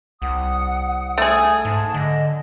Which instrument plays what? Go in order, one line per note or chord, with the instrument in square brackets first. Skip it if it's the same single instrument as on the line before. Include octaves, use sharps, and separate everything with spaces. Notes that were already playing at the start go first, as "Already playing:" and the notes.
[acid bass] C2 [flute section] F#5 D#6
[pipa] A3 G#4
[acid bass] G#2 [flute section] A5
[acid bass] D3 [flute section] D#5